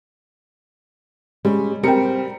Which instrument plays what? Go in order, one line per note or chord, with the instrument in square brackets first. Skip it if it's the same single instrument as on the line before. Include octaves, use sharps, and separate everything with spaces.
[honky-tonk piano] G3 [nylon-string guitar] G#3 C#4
[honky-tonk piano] G3 A#4 C#7 [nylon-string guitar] C4 G5